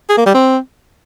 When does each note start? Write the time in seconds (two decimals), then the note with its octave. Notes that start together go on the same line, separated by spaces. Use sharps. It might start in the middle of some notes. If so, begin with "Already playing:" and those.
0.09 G#4
0.18 A#3
0.26 G3
0.34 C4